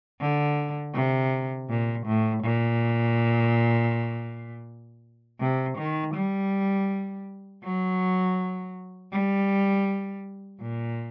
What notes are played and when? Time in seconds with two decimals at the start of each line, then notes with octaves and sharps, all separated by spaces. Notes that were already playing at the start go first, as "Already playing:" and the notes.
0.21 D3
0.94 C3
1.69 A#2
2.06 A2
2.43 A#2
5.40 C3
5.78 D#3
6.15 G3
7.64 F#3
9.12 G3
10.62 A#2